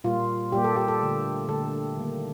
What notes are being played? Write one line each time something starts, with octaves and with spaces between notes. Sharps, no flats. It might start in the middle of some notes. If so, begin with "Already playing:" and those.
A#2 G3 A#3 F4
A#2 G3 A#3 G4
A4
G4
A4
D3 A3
D3 A3 A4
D#3 G3 A#3